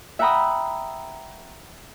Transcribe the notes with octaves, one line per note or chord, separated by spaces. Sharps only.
E5 F#5 G5 A#5 B5 D#6